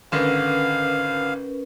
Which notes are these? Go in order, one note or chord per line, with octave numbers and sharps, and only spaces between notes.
G#1 D3 C#4 A#4 B4 F5